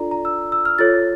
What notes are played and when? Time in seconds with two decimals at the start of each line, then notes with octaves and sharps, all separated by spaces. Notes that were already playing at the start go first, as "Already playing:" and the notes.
Already playing: D4 F4 A4 D5 A#5
0.11 A#5
0.25 E6
0.52 E6
0.65 F6
0.79 F4 A4 C#5 A6